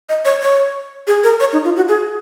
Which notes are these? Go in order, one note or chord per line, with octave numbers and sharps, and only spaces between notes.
D#5
C#5
C#5
G#4
A#4
C#5
D#4
F4
F#4
G#4